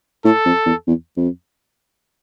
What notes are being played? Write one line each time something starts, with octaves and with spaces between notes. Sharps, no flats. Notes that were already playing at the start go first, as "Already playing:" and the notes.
A2 A4
F2
E2
E2
F2